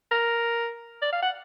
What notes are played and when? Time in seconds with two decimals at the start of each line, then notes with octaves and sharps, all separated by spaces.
0.11 A#4
1.02 D5
1.12 F5
1.22 F#5